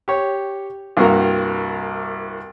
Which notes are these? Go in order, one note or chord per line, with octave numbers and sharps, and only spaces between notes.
G4 C#5
C2 G2 A#3 F#4 A#4